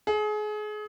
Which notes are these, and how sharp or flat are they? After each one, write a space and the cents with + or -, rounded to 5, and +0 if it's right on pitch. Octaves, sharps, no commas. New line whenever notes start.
G#4 +30